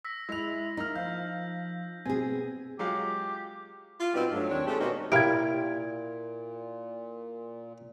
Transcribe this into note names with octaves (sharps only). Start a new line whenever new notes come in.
E6 A#6 B6
G#3 E4 E6 F7
A#3 D#4 F6
F3 F5 G6
B2 C4 G#4 G#5 G#6
F#3 G#3 F4 G4
F4
B2 G3 B3 C4 D#4
G2 F#3 A3
D#2 D#3 C4 D4 C#5
G#3 A3 C4 C#4 G4 A4
B2 A#3 C4 C#4 D#4 F#4
A#2 E4 G4 A#4 F5 G#6 D7